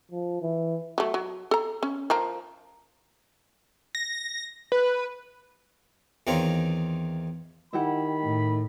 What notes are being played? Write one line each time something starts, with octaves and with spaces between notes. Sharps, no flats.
F3
E3
F#3 A3
F#3
A4 A#5
C#4
F3 A#4 A#5
A#6
B4
E2 D#3 C4 F4 C#5 A#5
D#3 E4 G4 F#5 B5
A2